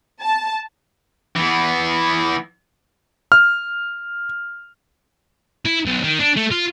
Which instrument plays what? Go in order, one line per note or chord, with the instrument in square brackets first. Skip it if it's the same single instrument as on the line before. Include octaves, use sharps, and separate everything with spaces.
[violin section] A5
[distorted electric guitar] E3 B3
[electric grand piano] F6
[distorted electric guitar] E4
B1
D#3
D4
A3
F4